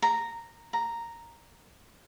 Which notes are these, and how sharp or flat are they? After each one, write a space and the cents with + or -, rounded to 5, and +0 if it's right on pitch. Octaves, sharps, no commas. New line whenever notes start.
A#5 -10
A#5 -5